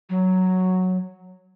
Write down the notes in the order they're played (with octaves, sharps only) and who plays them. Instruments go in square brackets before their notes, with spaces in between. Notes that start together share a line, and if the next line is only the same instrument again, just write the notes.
[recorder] F#3